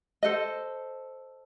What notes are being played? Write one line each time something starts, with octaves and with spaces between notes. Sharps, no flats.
A4 C5 D#5